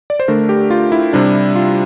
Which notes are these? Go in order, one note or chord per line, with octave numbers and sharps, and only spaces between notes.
D5
C5
D3 A3 D4 A#4
G4
F4
E4
C3 G3 D4
F4